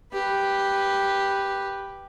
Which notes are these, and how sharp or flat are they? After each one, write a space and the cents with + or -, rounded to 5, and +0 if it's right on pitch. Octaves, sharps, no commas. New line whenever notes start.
G4 +0 B4 +0